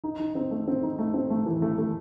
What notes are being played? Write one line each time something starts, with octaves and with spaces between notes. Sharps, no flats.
D#4
D#4
C4
A3
C4
D#4
A3
C4
A3
E3
A3
A3